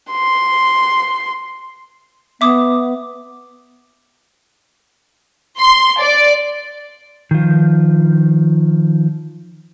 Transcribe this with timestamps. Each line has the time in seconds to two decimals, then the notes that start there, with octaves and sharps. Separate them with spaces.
0.12 C6
2.41 B3 E5 D6 D#6
5.59 C6
6.00 D5
7.31 D#3 F3